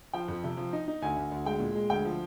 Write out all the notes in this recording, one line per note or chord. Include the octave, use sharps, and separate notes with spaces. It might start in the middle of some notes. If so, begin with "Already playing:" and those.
F3 G5
F2
C3
F3
D#4
D#4
D2 G#5
D2
D2
G#3 G5
A#2
G#3
D2 G5
F3